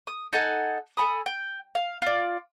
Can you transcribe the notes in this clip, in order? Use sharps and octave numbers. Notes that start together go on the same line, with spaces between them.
D#6
D#4 A4 F#5 G#5
A4 G#5 B5 D#6
G5
F5
F4 D5